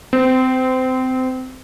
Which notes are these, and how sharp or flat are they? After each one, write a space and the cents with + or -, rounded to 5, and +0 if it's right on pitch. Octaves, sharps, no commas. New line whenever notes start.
C4 -25